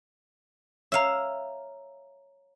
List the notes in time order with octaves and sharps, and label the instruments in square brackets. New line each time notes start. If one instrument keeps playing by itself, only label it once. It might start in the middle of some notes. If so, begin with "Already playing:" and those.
[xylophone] C#5 A#5 [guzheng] E5 F5